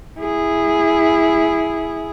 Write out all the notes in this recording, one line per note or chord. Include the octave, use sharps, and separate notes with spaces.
E4 G#4